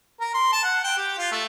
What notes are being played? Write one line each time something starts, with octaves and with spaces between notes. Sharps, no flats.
A#4
C6
A5
F#5
G5
G4
F4
A3